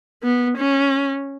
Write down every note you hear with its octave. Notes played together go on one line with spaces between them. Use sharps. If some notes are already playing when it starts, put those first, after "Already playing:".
B3
C#4